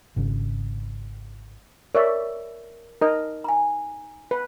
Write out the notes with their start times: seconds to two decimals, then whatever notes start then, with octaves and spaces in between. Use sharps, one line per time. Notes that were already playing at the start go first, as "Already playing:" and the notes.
0.16 G#1 C#3
1.95 A#4 C#5 D5 E5
3.01 D#4 A#4 D#5
3.44 G#5 A#5
4.31 B4